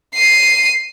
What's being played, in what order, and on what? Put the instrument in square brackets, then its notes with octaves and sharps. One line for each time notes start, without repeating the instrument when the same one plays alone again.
[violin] C7 D#7